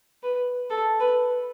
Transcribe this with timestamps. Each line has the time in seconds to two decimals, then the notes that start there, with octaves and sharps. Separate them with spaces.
0.23 B4
0.70 A4
1.00 B4